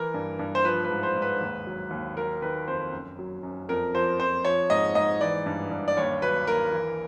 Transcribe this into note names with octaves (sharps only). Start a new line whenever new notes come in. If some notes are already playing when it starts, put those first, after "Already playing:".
Already playing: E3 A#4
G2
G2
C5
F3 B4
B4
G#2
C5
G#2
B4
D#2
F#3
D#2
F#3 A#4
D#3 B4
F2 C5
F#2
F#3
F#2
F2 A#4
F3 C5
F2 C5
F3 C#5
G#2 D#5
G#2 D#5
E3 D5
G2
G2
D5
D#2 C#5
F#3 B4
D#2 A#4
E3